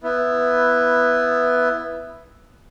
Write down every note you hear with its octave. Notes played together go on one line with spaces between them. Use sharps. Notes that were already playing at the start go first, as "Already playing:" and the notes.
B3 E4